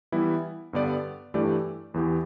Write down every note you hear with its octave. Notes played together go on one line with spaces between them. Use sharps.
E3 G3 B3 E4
G2 D3 B3 G4 D5
G2 E3 A3 G4 D5
E2 E3 B3 G4